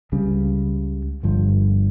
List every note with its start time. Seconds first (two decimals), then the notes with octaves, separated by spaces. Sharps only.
0.12 C#2 C#3 G3
1.23 G1 G2 F3